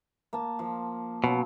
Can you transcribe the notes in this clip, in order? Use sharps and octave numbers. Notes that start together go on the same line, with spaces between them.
A#3 A5
F3
B2 F#3 C#4 F4